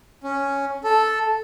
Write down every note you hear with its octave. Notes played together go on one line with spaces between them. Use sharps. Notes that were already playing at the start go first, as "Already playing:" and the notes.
C#4
A4